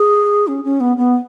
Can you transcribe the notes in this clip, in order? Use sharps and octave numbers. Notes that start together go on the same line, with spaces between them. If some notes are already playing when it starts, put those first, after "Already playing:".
Already playing: G#4
C#4
C#4
B3
B3